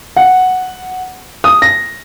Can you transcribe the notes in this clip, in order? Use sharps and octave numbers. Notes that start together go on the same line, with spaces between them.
F#5
D#6
A#6